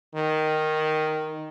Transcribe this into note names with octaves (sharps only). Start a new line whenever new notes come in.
D#3